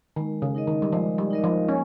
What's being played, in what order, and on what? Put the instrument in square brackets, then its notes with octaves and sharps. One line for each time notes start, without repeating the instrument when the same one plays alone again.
[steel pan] D#3 [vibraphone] G#3
[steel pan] C#3
[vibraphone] D#4 A#4 D#5
[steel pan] D#3
G3
[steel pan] F3 [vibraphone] G#3
[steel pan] G3
[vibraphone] D#4 A#4 D#5
[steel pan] F3
[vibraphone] A#3 [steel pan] C#4